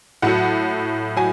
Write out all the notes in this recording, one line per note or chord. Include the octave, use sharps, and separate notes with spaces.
A2 F#3 F#5
F#3 G#5